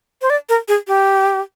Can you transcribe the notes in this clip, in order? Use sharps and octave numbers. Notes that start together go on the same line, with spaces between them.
C5
D5
A#4
G#4
G4